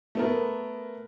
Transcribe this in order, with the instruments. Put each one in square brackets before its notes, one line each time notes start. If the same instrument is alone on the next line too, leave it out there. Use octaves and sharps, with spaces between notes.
[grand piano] A3 B3 A#4